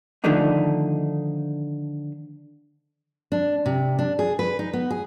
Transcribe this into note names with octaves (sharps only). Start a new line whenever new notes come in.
D3 D#3 F3 A3 D4 D#4
D4
C3
D4
G#4
B4
D#4
B3
G#4